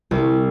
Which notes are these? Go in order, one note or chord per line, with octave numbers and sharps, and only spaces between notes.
C2